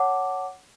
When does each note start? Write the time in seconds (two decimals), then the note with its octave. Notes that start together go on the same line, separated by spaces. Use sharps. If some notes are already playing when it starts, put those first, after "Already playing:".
Already playing: C#5 F#5 A5 D6